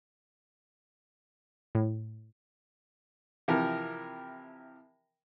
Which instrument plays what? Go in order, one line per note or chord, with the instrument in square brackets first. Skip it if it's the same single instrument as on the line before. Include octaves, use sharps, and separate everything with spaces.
[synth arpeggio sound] A2
[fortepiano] C3 E3 F3 G4 A#4